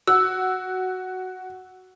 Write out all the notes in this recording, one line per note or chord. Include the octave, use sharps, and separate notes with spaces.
F#4 E6